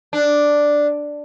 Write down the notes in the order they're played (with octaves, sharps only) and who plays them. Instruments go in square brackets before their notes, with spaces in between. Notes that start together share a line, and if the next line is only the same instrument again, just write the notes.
[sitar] D4